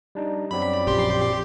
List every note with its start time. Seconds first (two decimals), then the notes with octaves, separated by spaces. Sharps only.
0.15 G3 D4 D#4
0.51 F#2 F#3 C4 D5 B5
0.87 A#1 F3 G4 C6